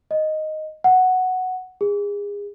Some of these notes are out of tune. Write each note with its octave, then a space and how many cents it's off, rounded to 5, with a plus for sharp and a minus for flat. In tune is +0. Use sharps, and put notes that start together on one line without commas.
D#5 +0
F#5 +0
G#4 -30